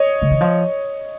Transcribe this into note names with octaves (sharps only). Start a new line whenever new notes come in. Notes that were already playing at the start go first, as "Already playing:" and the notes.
Already playing: C#5 D#5
C#3
D#3
F3